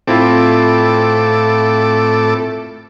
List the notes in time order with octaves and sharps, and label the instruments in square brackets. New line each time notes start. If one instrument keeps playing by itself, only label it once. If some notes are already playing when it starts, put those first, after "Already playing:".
[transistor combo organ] A2 A4 D6 [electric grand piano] C4 E4 F4